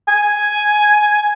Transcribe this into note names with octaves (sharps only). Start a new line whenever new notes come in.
G#5